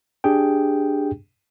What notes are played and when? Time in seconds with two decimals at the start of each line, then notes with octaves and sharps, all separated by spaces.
0.24 D4 G4 G#4 G5